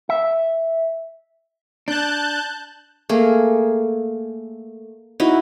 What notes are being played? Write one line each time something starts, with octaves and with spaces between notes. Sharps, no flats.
E5
D4 A5 F#6 G6
A3 A#3 G#4
D#4 E4 F#4